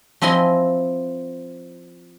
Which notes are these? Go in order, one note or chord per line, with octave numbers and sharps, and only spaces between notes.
F3 C4 E4 D#5 G#5 C6